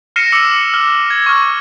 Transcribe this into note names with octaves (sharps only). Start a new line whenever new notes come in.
F6 A#6 C7 C#7 D#7 E7
D6 E6 C#7
F6
G#6
C#6 F6